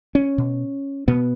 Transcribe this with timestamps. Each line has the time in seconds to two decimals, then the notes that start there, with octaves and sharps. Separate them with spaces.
0.15 C#4
0.38 B2
1.08 B2 B3